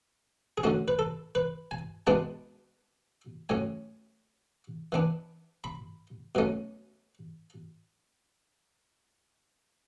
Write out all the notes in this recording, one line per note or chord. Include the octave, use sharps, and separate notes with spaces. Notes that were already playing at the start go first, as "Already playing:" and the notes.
G#4
D3 A3 C#4 F#4
B4
A4
B4
G#5
B2 G#3 B3 D4 A5
A2 F#3 C#4 G#5
E3 B3 D4
B5
B2 F#3 A3 C#4